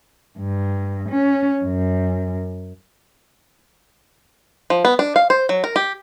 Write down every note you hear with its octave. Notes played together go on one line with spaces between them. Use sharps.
G2
C#4
F#2
F3
B3
D4
F5
C5
F#3
A#4
G4